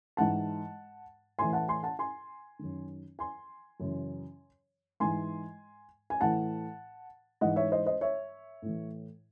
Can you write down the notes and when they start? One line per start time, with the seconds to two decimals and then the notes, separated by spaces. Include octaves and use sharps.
0.17 G#2 E3 F#5 A5
1.39 A2 E3 G#5 C6
1.53 F#5 A5
1.68 G#5 C6
1.83 F#5 A5
1.99 G#5 C6
2.59 F#2 D#3
3.19 G#5 C6
3.80 F#2 C#3 E3
5.00 G#2 E3 G#5 C6
6.10 G#5
6.21 A2 E3 F#5 A5
7.41 G#2 E3 D#5 F#5
7.56 C#5 E5
7.72 C5 D#5
7.86 C5 D#5
8.01 C#5 E5
8.62 A2 E3